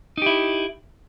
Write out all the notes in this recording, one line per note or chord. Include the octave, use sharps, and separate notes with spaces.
D#4 E4 G4